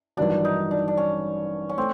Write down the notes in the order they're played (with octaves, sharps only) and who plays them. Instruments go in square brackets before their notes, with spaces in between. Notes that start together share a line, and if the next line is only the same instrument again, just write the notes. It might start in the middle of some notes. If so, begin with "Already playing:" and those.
[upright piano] A1 G2 D#3 F#3 [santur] D4
[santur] D#4
D4
D4
C#4
C#4
[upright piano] A3 [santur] C4